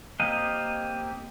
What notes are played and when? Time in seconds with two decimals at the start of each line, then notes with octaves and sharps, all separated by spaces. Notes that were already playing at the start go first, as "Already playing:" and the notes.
0.20 A#3 C4 G4 D#5 F5